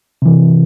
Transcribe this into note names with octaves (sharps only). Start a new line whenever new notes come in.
C3 E3